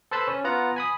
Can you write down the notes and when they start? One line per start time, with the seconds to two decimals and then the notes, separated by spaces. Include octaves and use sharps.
0.11 A4 B4 C5 A5 B5 C6
0.27 C#4
0.44 B3 F4 F#5 A#5
0.76 G#5 B5 D#6